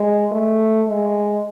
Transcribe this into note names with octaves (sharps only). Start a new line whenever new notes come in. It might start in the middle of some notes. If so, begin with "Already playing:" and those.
Already playing: G#3
A3
G#3